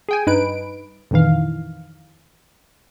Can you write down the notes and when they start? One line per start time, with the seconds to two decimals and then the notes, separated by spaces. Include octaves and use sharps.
0.09 G#4 G5 G#5
0.27 G2 D#4 B4 D7
1.11 A#1 F2 D#3 E3 F5